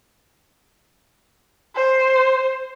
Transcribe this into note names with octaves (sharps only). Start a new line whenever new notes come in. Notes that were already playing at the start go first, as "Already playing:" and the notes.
C5